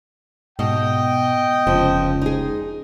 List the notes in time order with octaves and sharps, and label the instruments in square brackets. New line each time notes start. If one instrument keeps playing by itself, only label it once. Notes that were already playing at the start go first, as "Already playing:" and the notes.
[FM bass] G#2 [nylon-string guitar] B2 [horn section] D#5 G5
[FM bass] F1 [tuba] C#2 [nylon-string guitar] F3
[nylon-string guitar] D#4 G#4